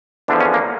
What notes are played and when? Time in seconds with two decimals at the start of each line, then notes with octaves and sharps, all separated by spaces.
0.28 E2 D3 F3 D4
0.41 C#4
0.54 A#3